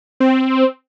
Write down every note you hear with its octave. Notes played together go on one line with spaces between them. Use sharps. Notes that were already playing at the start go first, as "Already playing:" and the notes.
C4